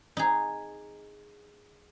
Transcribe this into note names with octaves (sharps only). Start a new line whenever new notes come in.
D#4 G#4